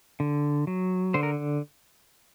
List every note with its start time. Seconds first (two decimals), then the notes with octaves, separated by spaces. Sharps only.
0.20 D3
0.67 F#3
1.14 D3 C5
1.23 A#4